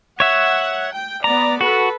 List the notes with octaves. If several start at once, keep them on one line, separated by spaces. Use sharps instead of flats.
C#5 E5 F#5
G5
B3 D5 A#5
F#4 A4 B4